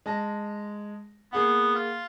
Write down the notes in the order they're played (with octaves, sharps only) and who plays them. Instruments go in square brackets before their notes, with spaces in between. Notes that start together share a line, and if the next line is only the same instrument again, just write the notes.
[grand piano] G#3 A5 A#6
[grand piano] A#3 G#4 F#5 [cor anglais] B3
[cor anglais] F4